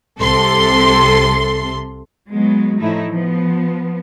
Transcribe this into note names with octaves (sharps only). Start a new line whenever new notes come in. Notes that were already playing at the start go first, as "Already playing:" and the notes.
C2 C3 A4 C6
F#3 G#3 B3
A2 F3 A3 D#4 E4
F3 B3